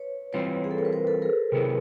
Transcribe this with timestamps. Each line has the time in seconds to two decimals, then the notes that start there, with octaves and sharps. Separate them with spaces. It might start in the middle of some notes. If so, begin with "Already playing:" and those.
Already playing: B4 C#5
0.33 E3 G3 C4 F4 B4 C#5
0.64 G#4
0.71 A4
0.78 A#4
0.85 B4
0.92 A#4 C5
1.07 A4 B4
1.22 G#4 A#4
1.52 C3 D#3 F#3 B3 E4